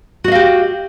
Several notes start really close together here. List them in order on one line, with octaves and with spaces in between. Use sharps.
F#4 D#5 F5 G4